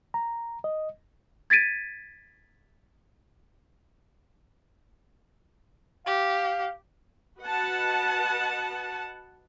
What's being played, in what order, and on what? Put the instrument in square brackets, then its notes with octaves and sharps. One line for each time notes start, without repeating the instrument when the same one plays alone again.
[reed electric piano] A#5
D#5
[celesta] G#6 A6 B6 D7 D#7
[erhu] G4 [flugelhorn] F5
[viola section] F#4 B4 D#5 F#5 A5